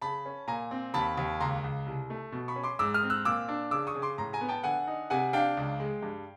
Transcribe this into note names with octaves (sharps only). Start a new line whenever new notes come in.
C#3 A5 B5
C#4
A#2 G#5 A#5
C4
D#2 A5 B5
D#2
C#2 A#5 C6
C#2
C2
A3
B2
B5 C#6
C#4
C6 D6
G#2 D6 E6
D#6 F6
C4
E6 F#6
A#2 D6 E6
D4
C#3 D6 E6
C#6 D#6
C#3
C6 D6
A2 A#5 C6
G#5 A#5
B3
G5 A5
D3 F#5 G#5
D#4
C3 F#5 G#5
D4 F5 G5
C#2
G#3
G2